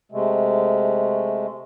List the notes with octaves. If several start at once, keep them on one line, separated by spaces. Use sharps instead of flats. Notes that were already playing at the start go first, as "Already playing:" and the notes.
C3 G#3 A3